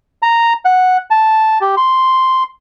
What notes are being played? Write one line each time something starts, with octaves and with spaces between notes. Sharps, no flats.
A#5
F#5
A5
G4
C6